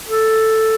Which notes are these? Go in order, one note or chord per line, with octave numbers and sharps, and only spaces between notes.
A4